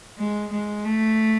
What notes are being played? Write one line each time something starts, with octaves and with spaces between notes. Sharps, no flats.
G#3
G#3
A3